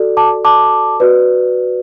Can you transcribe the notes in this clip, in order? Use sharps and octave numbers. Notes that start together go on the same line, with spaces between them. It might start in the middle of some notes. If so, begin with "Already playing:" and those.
Already playing: F#4 A4 D5
A5 D6
A5 D6
F#4 B4 D5